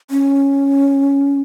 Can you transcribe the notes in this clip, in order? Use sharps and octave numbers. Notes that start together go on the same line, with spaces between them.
C#4